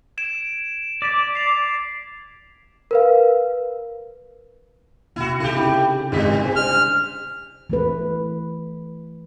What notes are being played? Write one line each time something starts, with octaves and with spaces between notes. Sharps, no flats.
G#6 D7 E7
D5 A6 B6 E7
C7 F7
A#4 B4 F5
C3 A#3 B3 E4 F#4
C#3 A3 D#4 E4 G4
C#4 G#4 A4 B5
G#1 G#2 G3 G#3 B6
C5 G#5
D4 F6
E3 A3 B4